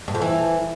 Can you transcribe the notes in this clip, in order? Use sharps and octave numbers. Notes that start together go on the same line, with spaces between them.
G2
F2
E3